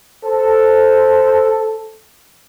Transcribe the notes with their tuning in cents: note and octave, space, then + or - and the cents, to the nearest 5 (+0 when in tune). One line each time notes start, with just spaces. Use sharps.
A4 +0 C5 +0